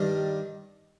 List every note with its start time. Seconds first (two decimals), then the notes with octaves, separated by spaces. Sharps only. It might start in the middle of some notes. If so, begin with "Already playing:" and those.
Already playing: G2 D#3 G3